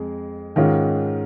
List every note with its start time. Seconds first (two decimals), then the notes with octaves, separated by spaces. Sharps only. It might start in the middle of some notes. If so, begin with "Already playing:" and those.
Already playing: F2 G#3 G#4
0.56 G#2 D#3 G#3 C#4 F4